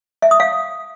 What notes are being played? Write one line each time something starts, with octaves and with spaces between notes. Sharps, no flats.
E5
D#6
F5